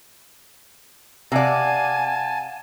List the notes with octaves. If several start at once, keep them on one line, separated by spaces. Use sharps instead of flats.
C3 D5 F5 F#5 G#5 A5